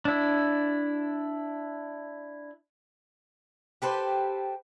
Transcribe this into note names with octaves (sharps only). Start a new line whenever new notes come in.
D4 E4
G4 A4 B4 C5